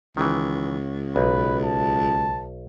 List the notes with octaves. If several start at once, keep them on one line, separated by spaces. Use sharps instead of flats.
C#2 D#3 E3
B1 B4
A5